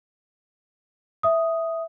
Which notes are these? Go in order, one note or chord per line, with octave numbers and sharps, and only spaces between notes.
E5 D#6